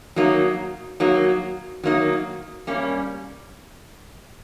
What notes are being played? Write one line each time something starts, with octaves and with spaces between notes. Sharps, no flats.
F#3 A#3 D#4
F#3 A#3 D#4
F#3 A#3 D#4
G3 A#3 C#4